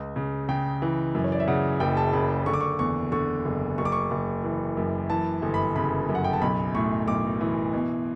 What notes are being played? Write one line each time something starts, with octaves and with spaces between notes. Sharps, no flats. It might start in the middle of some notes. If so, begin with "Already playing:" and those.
Already playing: C#2
C#3
C#3 G5
E3
F#2
C#5
D5
E5
C#3 F#5
F#1 G5
A5
C#3 B5
D3 C#6
D6
C#6
E2 C#6
D3 C#6
F#1
F#1 C#6
D6
C#6
F#1
E3
F#2
E3 A5
G1
B5
C#3 B5
F#2
F#5
G5
A5
B1 B5
A2 C#6
B1 D6
E3
B2